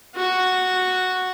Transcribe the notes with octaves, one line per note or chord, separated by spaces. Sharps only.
F#4